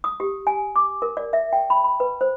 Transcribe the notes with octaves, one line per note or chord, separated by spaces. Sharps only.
D#6
G4
G#5
D6
A#4
D5
E5
G5
B5
B5
B4
C5